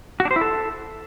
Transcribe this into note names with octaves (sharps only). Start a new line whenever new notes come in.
F#4
D4
C5
E4
A4